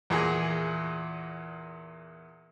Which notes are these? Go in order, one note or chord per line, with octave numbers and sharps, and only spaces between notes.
E2 A#2 G#4